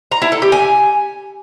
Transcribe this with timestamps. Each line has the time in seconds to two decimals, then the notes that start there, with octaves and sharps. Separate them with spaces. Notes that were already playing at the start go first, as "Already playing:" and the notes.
0.11 A#5
0.22 E4
0.32 A4
0.42 G4
0.52 G#5